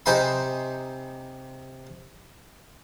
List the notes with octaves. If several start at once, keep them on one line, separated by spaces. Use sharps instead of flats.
C3 D#4 C5 G#5 B5 C6